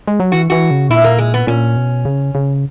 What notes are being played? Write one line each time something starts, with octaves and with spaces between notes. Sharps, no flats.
G#3
F#3
E3 F#4
E3 F#4
C#3
A#2 E4
A#3
G#3
B3
A#2 C#4
B2
C#3
C#3